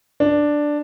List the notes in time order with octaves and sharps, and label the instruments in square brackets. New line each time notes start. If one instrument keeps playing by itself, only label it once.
[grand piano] D4